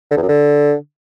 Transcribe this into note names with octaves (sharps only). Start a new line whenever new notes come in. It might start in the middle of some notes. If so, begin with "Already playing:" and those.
D3
E2
F#2
D3